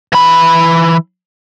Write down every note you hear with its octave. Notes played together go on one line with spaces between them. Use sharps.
E3 B5